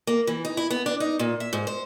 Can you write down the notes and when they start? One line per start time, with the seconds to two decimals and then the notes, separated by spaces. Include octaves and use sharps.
0.07 A#3
0.27 E3
0.45 D#4
0.57 E4
0.70 B3
0.86 D4
1.00 D#4
1.19 A#2
1.40 E5
1.53 G#2
1.67 C5